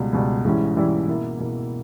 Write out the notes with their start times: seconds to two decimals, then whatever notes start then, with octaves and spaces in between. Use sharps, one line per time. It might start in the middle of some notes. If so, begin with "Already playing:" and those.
Already playing: C#2 B2 G3
0.13 C#2 B2 G3
0.45 G#2 E3 G3 C#4 E4
0.76 G#2 E3 G3 C#4 E4
1.08 B2 A#3 E4
1.40 B2 A#3 E4